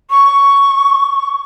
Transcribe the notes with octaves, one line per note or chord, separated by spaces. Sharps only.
C#6